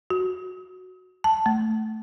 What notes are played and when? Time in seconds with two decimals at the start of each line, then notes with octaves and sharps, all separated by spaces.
0.10 F#4
1.24 A5
1.46 A3